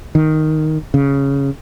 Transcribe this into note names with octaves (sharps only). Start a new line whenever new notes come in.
D#3
C#3